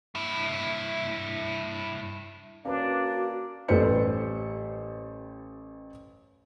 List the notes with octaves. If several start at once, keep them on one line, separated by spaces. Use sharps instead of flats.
G2 E4
A#3 C#4 D4 F#4 B4
A1 G3 A4 B4 C5 C#7